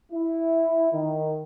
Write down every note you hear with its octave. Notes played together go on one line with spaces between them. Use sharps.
E4
D#3